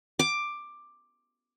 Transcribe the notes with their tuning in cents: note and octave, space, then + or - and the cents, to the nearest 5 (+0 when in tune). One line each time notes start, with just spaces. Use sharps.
D6 +10